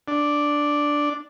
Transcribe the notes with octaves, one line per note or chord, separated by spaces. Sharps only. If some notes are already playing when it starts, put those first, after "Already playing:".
D4